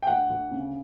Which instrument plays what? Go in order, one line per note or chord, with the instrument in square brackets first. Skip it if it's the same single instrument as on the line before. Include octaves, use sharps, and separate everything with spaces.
[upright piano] G5
D2 F#5
D2
C#3